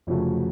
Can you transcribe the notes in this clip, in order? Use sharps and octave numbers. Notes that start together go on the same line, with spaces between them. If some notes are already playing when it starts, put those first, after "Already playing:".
F1 F2 C#3 F#3 A3